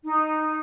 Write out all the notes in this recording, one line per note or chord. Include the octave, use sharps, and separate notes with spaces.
D#4